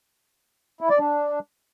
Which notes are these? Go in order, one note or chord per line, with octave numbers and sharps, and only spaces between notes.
E4
D5
D4